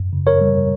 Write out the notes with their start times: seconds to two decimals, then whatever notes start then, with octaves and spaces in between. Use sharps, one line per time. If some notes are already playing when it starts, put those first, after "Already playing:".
Already playing: F#2
0.13 C#3
0.27 A#4 C#5
0.41 G3